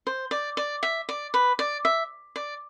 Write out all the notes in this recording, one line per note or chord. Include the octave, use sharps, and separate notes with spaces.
C5
D5
D5
E5
D5
B4
D5
E5
D5